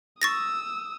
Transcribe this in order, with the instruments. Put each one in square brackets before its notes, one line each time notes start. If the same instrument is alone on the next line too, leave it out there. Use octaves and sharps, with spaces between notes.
[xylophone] C#6 A6 A#6 [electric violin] D#6 E6